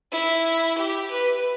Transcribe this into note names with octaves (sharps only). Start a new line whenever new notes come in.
E4
G4
B4